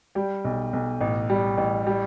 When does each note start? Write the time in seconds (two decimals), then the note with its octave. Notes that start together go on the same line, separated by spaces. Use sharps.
0.15 G3 G5
0.45 B1
0.73 B1
1.00 A1
1.30 G3
1.58 A1
1.87 G3